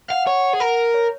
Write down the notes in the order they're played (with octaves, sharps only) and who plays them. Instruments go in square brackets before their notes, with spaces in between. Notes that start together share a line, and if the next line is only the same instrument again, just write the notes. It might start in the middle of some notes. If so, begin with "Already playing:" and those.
[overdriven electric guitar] F5 [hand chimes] F#5
[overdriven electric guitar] C#5 [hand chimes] F#5
[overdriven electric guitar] G#4
A#4
[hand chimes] C#5